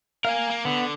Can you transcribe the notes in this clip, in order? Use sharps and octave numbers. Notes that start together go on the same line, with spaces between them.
A#3 A#4 F5 G#5
A#3
D3 B3